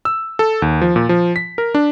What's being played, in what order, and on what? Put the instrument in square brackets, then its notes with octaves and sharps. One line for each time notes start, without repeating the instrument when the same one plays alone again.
[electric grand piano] E6
A4
D#2
F3
A#2
F3
B6
A#4
D4